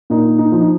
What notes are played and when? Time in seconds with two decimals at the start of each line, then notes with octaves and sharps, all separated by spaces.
0.10 A#2 D#4
0.38 D#4
0.52 F3
0.61 D#4